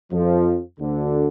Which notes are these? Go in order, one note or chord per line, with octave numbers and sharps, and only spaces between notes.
F2 F3
D2 D3